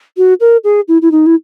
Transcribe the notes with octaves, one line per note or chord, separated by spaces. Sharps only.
F#4
A#4
G#4
E4
E4
D#4
E4